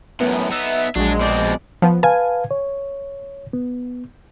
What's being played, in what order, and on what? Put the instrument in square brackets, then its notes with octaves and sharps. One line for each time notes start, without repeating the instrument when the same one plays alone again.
[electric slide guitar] F#2 A2 [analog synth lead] B3
[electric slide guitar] B3 D#4 [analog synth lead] E5
[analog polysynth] A#1 G#3 [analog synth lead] F#3 [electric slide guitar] D4
[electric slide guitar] B2 C4 [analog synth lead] D5
[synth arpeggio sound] F3 B3
[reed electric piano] B4 F5 A5 [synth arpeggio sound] G#5
[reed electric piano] C#5
B3